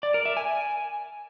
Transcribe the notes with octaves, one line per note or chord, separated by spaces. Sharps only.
D5
A#4
E5
G#5